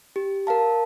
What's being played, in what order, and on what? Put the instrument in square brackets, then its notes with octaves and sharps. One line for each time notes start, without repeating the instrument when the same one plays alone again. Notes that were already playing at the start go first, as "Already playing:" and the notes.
[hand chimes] G4
A#4 F5 A5